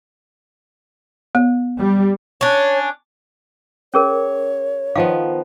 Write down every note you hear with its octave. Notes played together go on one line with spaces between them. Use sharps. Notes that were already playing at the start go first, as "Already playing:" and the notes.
B3
G3
C#4 D4 C#5
C#4 G#4 A#4 C#5
D#3 F3 B3 F5